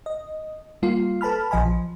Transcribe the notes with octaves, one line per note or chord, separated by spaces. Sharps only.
D#5
G3 A#3 F4
A4 B4 A5 B5 F6
A#1 F3 D#5 G#5 B5
F3